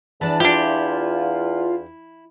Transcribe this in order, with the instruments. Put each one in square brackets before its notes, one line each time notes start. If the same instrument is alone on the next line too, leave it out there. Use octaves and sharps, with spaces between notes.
[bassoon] E2 [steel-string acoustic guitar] E3 D4 [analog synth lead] A5
[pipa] D4 G4 [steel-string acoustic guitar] E4 [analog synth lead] F4